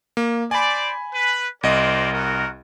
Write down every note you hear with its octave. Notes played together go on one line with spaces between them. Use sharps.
A#3
C5 D5 G#5 B5
B4
C2 A#4 C5 D5 D#5
F#4 A#4